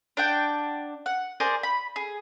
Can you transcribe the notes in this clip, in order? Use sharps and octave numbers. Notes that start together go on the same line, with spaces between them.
D4 F#5 G5
F#5
G#4 A#4 C5 D5
B5
G#4